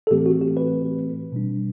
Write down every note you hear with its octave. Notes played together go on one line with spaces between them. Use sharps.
A4
A2 E3 A3 C4 G4
F#4
G4
B4
B2 G3 D4